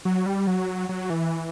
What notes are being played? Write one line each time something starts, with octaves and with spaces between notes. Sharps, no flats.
F#3
G3
F#3
F#3
E3